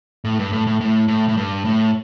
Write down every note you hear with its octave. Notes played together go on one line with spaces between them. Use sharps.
A2
G2
A2
A2
A2
A2
A2
G2
A2